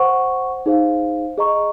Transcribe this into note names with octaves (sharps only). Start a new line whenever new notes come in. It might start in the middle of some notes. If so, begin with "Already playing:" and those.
Already playing: C5 F#5 C#6
D#4 G#4 C5 F5
G#4 D#5 A#5 C#6